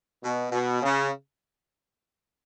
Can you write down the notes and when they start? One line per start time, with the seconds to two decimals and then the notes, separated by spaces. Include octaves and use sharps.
0.23 B2
0.52 B2
0.83 C#3